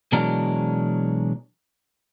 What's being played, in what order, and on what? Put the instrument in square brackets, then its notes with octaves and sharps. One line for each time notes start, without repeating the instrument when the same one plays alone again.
[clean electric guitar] B2 E3 F#3 G#3 D4 A#4